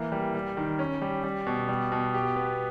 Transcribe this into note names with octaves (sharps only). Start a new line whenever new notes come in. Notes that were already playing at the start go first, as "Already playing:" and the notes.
Already playing: E3 A#3
G3
G3
D#3
C#4
G3
G3
B2
G3
B2
G4
B3